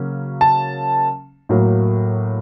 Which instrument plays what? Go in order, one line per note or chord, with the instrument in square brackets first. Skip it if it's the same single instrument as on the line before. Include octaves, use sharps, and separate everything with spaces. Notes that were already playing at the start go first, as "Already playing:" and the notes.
Already playing: [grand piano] C#3 F#3 A#3 C#4
A5
A2 F#3 A#3